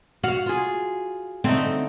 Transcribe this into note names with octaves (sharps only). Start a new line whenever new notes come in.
F#4 F5
F4 G#4
D3 A3 C4 D#4